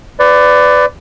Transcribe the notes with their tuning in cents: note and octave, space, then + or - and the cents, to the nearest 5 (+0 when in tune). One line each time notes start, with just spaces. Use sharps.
B4 +25 D5 +0